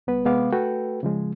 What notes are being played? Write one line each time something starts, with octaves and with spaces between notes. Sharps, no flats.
C#2 G3 B3 B4
C3 G#3 B3 F5 D6
A3 F#4 A4 B4 G5
C#3 F3 G#3